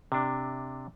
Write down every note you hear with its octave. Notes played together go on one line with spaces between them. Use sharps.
C3 D4